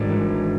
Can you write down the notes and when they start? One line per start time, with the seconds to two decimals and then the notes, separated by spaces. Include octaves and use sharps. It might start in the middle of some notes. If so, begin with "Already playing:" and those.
Already playing: G#1 G#2 D4
0.09 E3